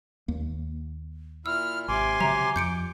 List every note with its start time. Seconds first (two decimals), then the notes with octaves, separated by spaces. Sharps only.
0.28 D#2 A#3
1.46 A#2 E4 E6 F6
1.88 G#1 C3 G#5 C6 D6
2.20 C#3 F#3 E5 A#5
2.56 F2 G6 C#7 D7